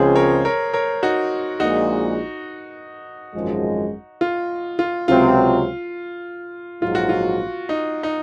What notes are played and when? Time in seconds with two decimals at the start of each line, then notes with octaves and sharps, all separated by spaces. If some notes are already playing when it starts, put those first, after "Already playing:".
Already playing: C#2 C#3 F3 G#3 C4 G#4 C5
0.16 A#4 C#5
0.45 A#4 C#5
0.73 A#4 C#5
1.03 D#4 F#4
1.60 A#1 A#2 G#3 D#4 F#4
3.35 G#1 F#2 F3 G#3
4.21 F4
4.79 F4
5.08 C#2 C3 F#3 C4 F4
6.82 A#1 G#2 F#3 F4
6.95 F#4
7.09 F4
7.69 D#4
8.03 D#4